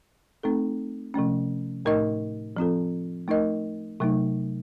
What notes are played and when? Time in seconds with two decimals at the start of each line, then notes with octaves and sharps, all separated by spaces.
0.43 A3 C4 D#4 A4
1.14 C3 F3 A3 C#4
1.85 A2 A3 D#4 A#4 D#5
2.57 F3 C4 F4 A4
3.28 A3 D#4 A#4 D#5
4.00 C3 F#3 A3 D#4